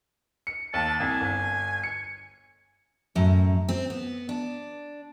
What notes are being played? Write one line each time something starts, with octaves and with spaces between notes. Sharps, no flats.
C#7
D#2 A5
C2 G#5
G1
C#7
F#2 A2
C4
B3
D4